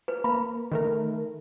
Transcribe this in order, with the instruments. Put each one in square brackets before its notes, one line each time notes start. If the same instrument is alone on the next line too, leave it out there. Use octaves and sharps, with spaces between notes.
[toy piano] B4
[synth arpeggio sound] A#3 [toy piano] B5
[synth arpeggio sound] D#3 A3 A#4